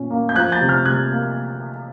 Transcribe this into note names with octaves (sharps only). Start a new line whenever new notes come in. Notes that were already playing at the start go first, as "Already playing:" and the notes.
Already playing: A#2 C#4
A#3
G6
F3 F#6 G#6
G6 A6
C3
F6 G6
C3 F#6 G#6
A#3